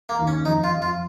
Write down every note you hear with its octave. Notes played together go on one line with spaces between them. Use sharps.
A#3
D#2
C#4
F2 D#4
F4
F2
F4